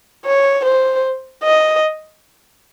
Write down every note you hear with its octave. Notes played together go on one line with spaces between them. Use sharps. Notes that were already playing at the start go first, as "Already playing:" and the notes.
C#5
C5
D#5